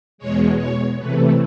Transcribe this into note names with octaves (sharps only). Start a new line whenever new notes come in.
E2 B2 G#3 C#5
C#5
C3 E3 A3 B4